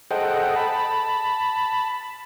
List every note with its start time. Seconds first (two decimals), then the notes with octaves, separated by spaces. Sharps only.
0.11 G#4 A4 C5 D#5 F#5 G5
0.56 A5 B5